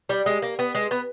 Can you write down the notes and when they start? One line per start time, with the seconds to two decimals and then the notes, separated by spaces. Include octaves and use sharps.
0.09 G3
0.26 G#3
0.42 A#3
0.59 B3
0.75 G#3
0.91 B3